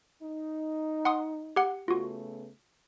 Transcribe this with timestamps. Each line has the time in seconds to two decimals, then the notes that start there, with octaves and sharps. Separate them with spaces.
0.22 D#4
1.05 F#5 C6 D#6
1.56 G4 F#5
1.88 C#3 A3 B3 F4 F#4